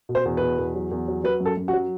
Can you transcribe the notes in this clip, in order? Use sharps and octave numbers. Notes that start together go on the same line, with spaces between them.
B2
C5
E2
B2 B4
E2
F#3
E2
F#3
F#3 B4
F#2
A4
F#2
F#4
F#3